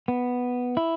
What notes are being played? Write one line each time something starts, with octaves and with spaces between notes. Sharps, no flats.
B3
E4